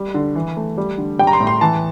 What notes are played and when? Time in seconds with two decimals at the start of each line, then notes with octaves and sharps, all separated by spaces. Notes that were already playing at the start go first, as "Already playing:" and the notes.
Already playing: G3
0.14 D3
0.35 E3
0.57 A3
0.78 G3
0.98 D3
1.19 G3 G5
1.27 A#5
1.33 C6
1.40 A2
1.47 C6
1.61 E3 A5